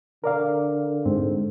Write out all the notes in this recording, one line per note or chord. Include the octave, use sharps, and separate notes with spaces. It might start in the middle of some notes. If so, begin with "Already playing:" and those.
D3 A#4 D5 F5
G#2 C4